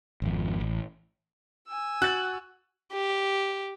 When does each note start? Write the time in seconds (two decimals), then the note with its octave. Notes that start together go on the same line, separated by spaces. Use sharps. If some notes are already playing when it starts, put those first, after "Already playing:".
0.22 G#1 F2
0.61 A1
1.68 G#5 E6
2.02 F#4 F#6 A6
2.93 G4